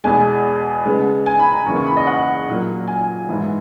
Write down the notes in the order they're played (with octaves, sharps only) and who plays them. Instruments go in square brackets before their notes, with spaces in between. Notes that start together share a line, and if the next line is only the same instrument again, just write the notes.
[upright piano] E2 B2 G#3 G#5
C#3 G#3 B3
G#5
B5
A#5
E2 C#3 E3 A#3 C#6
C#6
B5
D#5
F#5
A#2 F#3 A#3
G#5
G#2 E3 B3